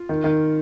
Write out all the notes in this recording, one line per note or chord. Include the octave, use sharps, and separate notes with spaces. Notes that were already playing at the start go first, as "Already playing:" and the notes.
Already playing: F4
D#3
D#3